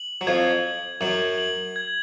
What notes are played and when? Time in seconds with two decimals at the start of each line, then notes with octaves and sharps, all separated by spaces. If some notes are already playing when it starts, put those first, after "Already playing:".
Already playing: F#7
0.21 F#3
0.27 F2 F3 G#6
0.64 F#7
1.01 F#2 F#3 F#7
1.38 F#7
1.76 G#6